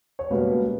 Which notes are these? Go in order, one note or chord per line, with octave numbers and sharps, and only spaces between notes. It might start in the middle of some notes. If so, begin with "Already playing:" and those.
C#5
C#2 B2 G3 A#3 B4